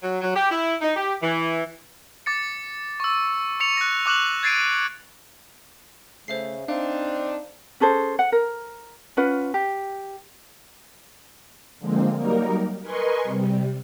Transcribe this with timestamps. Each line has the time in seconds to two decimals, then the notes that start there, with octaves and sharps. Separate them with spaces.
0.03 F#3
0.21 F#3
0.35 G4
0.51 E4
0.81 D#4
0.96 G4
1.22 E3
2.26 D6 A6 C#7
3.00 C#6 E6
3.60 C#6 C#7 F7
3.77 F#6 A#6
4.06 C#6 D6 F#6 E7 F#7
4.43 G#6 A6 C7 D7 D#7
6.28 C#3 A3 C5 E5 C7
6.68 C4 D4 D#4 F5
7.80 C#4 G#4 A4 C5
8.19 F#5
8.32 A#4
9.17 C#4 F4 B4 F#5
9.54 G4
11.79 D3 F3 G#3 A#3 C4
12.16 F#3 G3 A#3 D#4 A#4
12.81 A#4 B4 D#5 G#5 C6 C#6
13.24 C3 G3